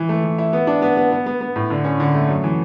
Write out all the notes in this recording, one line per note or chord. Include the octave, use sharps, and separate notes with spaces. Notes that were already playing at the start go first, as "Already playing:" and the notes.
Already playing: E3
A3
E3
E4
B3
D4
B3
B3
B3
B3
B3
A2
D3
C#4
D3
A3
F#2
E3